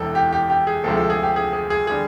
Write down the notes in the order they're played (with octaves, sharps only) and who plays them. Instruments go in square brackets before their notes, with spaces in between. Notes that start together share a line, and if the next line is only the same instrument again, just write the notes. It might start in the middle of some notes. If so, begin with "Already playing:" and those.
Already playing: [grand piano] E1 E2 C3 A4
G4
G4
G4
G#4
D2 C3 F3 G#3 A4
A4
G#4
G4
G#4
G#4
G#4
D3 G3 G#4